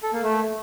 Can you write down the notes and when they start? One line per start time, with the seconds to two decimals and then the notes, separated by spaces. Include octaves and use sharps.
0.03 A4
0.13 A#3
0.23 A3